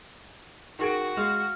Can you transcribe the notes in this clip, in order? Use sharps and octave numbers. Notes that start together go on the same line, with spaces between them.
D#3 F#4 G#4 D7
G#3 F5